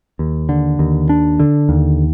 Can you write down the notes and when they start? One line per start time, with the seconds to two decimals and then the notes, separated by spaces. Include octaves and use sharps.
0.19 D#2
0.49 D3
0.79 D#2
1.09 D4
1.39 D3
1.69 D#2